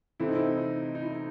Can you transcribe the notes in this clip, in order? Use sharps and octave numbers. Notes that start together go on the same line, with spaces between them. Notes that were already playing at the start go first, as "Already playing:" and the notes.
C3 E3 A3 C4 E4
D#4
C4 E4
D#4
D#4
E4
D#4